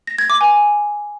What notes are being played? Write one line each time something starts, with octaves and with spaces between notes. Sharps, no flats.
A#6
G#6
D6
G#5